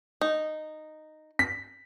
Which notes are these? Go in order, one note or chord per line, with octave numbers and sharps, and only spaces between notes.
D#4
B6